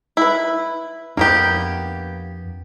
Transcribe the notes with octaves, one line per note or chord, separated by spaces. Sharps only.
E4 B4
F2 A#3 B3 D4 G4